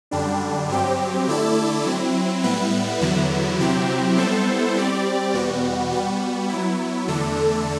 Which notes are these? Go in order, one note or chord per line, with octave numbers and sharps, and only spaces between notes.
F#2 D3 G3 D4
G2 F#3 C4 G4
D3 A3 E4 A4 D5
F#3 C4 E4
A2 G3 B3 E4 B4
E2 D3 F#3 B3 E4
C3 F#3 C4 E4 G4
G3 B3 E4 A4 C5
G3 C4 G4 D5
E2 B2 G3 B3 F#4
G3 B3 F#4
F#3 B3 E4
E2 D3 A3 D4 A4